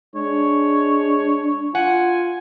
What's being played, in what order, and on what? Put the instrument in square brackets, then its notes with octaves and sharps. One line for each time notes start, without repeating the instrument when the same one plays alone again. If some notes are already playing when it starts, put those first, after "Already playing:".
[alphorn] G#3 [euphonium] D4 [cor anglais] C#5
[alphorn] F4 [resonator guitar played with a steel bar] F#5 [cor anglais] G#5